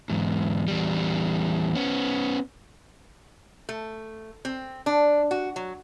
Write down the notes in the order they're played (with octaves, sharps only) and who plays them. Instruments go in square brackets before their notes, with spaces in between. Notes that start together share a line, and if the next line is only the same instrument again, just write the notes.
[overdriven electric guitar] E2 G#2
E2 G3
B3 C#4
[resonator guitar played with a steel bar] A3
C4
D4
F#4
F#3